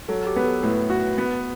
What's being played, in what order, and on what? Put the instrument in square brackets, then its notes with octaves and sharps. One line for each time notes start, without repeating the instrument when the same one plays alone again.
[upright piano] F#3 [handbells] A4
[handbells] G4
[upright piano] B3 [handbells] B4
[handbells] A4
[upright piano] A2 [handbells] B4
[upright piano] F#4
B3